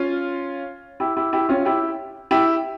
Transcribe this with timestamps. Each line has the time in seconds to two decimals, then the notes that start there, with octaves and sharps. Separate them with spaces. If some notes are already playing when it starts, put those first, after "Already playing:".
Already playing: C#4 F4
1.00 E4 G4
1.17 E4 G4
1.33 E4 G4
1.49 C#4 F4
1.65 E4 G4
2.31 E4 G4